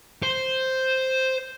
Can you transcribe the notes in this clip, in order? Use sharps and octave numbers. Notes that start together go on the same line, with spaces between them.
C5